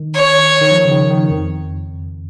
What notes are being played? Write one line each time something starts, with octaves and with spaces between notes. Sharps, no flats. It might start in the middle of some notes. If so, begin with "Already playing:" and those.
Already playing: D#3
C#5
D#3
F3
C#3
D#3
D#3
F2